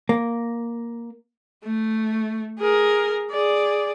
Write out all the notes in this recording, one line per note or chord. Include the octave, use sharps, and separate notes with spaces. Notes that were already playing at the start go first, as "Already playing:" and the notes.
A#3
A3
G#4 A#4
G#4 D5